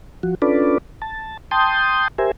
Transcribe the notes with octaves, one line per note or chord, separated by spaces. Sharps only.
F3 F#4
C#4 D4 F4 A4 B4 D5
A5
G5 A5 C6 D#6 G6
G4 A#4 C5 E5 G#5